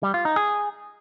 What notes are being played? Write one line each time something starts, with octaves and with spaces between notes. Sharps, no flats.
G3
F4
D#4
G#4